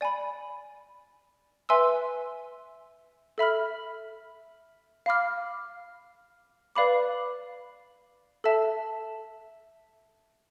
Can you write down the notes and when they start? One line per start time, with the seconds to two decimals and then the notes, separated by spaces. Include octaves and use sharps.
0.01 D5 G#5 B5
1.69 B4 E5 G#5 C6 E6
3.38 A4 E5 B5 F6
5.06 F5 B5 D6 F6
6.76 B4 D5 F5 B5 D6
8.44 A4 E5 A5